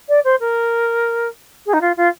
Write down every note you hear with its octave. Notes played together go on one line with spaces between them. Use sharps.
D5
C5
A#4
G#4
D#4
F4
F4